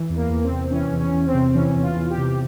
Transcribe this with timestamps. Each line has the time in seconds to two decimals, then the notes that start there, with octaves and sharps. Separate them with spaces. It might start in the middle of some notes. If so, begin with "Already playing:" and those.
Already playing: E3
0.09 E2
0.16 A#3
0.30 E2
0.44 C4
0.51 C3
0.71 E3 C#4
0.92 E2
1.00 C#4
1.13 E2
1.27 C4
1.34 C3
1.54 E3 C#4
1.75 E2
1.83 F4
1.96 E2
2.10 G4
2.17 C3